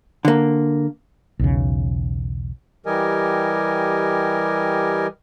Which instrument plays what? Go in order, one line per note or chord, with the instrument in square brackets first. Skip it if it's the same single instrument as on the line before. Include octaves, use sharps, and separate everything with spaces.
[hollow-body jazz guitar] D3 A#3
[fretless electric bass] B1 E2 C#3
[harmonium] E3 G3 G4 A#4 D#5 G#5